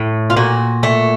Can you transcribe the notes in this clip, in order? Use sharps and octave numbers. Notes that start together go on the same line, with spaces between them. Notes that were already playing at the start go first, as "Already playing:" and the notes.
Already playing: A2
F4
A#2 F#4
A3